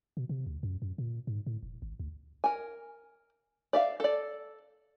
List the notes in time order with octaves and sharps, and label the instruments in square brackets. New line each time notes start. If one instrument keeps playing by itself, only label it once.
[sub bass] B2
C3
D2
F#2
F#2
A#2
G#2
A2
E1
G#1
D2
[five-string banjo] A#4 G#5
D5 E5 F5
A4 D5